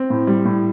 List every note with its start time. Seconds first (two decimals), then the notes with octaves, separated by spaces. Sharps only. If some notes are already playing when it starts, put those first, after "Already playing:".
Already playing: C4
0.10 A2
0.27 G3
0.45 A2